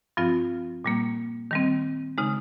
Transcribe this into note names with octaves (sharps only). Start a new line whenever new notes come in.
G2 F3 C4 F4
A#2 G3 A#3
D#3 G3 C4
C#3 G#3 D#4